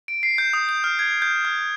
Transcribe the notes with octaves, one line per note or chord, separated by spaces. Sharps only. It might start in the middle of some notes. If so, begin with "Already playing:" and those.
D7
C7
G6
D#6
G6
F6
G#6
G6
F6